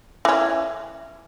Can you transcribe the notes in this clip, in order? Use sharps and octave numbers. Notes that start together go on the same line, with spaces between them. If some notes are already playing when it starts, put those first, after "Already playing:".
E3 C#4